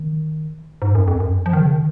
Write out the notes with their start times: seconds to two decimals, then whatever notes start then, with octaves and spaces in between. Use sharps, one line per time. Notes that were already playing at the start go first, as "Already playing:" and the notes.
Already playing: D#3
0.82 G#2
0.95 F#2
1.08 F2
1.20 F#2
1.46 F3
1.53 D#3
1.60 C#3
1.68 D#3